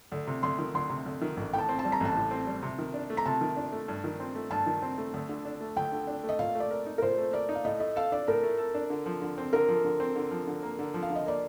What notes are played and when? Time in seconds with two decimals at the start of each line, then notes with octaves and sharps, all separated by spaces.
0.12 D2
0.27 C3
0.43 D2 C6
0.59 D#3
0.74 D2 C6
0.90 C3
1.06 D2
1.22 D#3
1.37 A1
1.53 A2 G5
1.58 A5
1.69 C4
1.79 A5
1.84 G3
1.92 A#5
2.00 A1 A5
2.15 A2
2.31 C4
2.47 G3
2.63 C3
2.78 D#3
2.94 D4
3.10 A3
3.17 A#5
3.25 C3 A5
3.41 D#3
3.57 D4
3.72 A3
3.88 G2
4.04 D#3
4.20 C4
4.35 A3
4.51 G2 A5
4.66 D#3
4.82 C4
4.98 A3
5.14 D2
5.29 D3
5.45 D4
5.61 A3
5.76 D2 G5
5.92 D3
6.07 D4
6.24 A3 D#5
6.39 A#2 F5
6.55 A3
6.60 D5
6.71 A#4
6.86 D#4
6.98 A#4
7.02 A#2 C5
7.18 A3
7.33 A#4 D5
7.49 D#4
7.55 F5
7.65 A2 D#5
7.80 A3 D#5
7.96 A4 F5
8.12 D4 D5
8.28 A2 A#4
8.43 A3
8.58 A4
8.74 D4
8.90 D3
9.06 F3
9.22 D3
9.38 C4
9.53 D3 A#4
9.68 F3
9.84 D3
10.00 C4
10.16 D3
10.31 F3
10.47 D3
10.63 A#3
10.79 D3
10.94 F3
11.03 F5
11.10 D3
11.15 D#5
11.26 A#3 D5